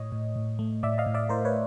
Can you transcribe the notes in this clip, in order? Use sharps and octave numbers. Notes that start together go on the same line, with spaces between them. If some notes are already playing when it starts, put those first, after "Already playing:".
Already playing: A2 C#5 D#5
A2
A2
A3
A2 D5 E5
D#5 F5
A2
D5 E5
A2 A#4 C5
B4 C#5